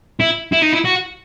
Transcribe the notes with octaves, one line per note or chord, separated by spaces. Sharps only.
E4
E4
D#4
E4
F#4